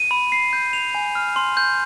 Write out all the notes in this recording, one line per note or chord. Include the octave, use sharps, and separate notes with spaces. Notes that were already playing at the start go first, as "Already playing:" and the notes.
Already playing: D#7
B5
C7
G6
F7
G#5
F6
C6
G6